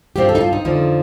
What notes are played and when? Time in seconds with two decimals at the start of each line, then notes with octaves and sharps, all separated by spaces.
0.16 G2 F3 C4 G4
0.29 A4
0.35 D#4
0.41 F4
0.53 D#4
0.65 F2 D3 F3